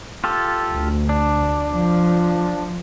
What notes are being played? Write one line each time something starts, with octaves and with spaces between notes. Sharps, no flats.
F4 G4 A4
D2
D4
F3